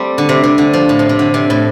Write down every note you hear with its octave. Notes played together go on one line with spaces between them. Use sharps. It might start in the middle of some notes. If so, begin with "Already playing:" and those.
Already playing: G3 A3 C4
D3
C3
C3
D3
F3
A2
C3
C3
D3
C3
A2